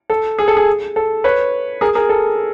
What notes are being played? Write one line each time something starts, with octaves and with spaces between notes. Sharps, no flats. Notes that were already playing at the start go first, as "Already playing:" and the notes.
A4
G#4
A4
G#4
A4
B4 C#5
G#4 A#4
G#4 A#4
A4